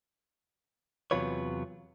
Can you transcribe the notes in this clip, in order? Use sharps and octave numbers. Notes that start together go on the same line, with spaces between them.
E2 C3 F#3 F4 B4 C#5